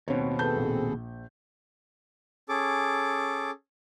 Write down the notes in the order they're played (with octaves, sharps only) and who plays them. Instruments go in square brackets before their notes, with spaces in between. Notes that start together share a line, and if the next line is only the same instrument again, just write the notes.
[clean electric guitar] D#2 B2 [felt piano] C4 C#5
[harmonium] C4 G#4 A4 [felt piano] B4 A5 G6
[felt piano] A#1
[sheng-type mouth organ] C#4 G#4 A4 D6